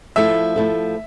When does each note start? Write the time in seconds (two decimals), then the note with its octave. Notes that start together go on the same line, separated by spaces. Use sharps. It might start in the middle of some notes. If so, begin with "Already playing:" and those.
0.16 F3 A3 E4 A4 E5
0.56 F3 A3 E4 A4